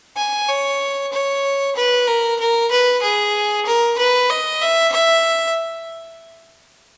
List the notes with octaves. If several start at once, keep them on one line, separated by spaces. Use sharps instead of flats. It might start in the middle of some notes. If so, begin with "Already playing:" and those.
G#5
C#5
C#5
B4
A#4
A#4
B4
G#4
A#4
B4
D#5
E5
E5